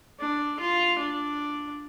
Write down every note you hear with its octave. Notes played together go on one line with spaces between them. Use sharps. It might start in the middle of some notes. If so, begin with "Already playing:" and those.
D4
F4
D4